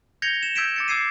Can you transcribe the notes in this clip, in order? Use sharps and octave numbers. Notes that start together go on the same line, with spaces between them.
G6 G#6 A#6 C#7 F7 G7
E7
E6 G6 G#6 B6 D7 E7
D6 A6 C#7
D6 E6 G#6 C7 D#7